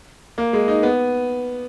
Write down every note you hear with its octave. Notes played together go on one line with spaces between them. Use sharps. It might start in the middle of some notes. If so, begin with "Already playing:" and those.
A#3
G#3
D#4
B3